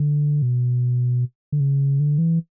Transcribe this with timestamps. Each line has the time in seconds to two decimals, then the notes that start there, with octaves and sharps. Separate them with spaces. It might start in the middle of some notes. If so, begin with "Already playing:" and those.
Already playing: D3
0.42 B2
1.52 D3
1.60 C#3
2.00 D3
2.18 E3